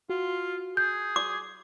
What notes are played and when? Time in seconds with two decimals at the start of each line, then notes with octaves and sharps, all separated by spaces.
0.09 F4 F#4
0.77 G#4 G6
1.16 D6